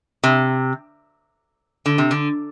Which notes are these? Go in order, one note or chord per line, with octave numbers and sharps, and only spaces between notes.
C3
D3
C3
D3